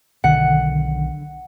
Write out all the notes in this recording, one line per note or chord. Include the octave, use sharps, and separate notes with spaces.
B1 D3 D#3 F#5